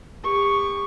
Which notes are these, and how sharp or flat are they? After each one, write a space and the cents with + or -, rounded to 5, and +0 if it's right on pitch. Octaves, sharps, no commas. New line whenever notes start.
G4 +40 C#6 +0